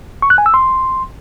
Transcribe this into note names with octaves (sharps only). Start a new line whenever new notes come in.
C#6
F#6
G#5
E6
C6